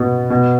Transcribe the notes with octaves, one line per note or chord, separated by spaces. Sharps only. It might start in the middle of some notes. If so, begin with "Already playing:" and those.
Already playing: B2 B3
B2